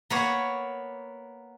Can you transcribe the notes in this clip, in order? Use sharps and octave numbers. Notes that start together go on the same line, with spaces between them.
A#3 B3 C#5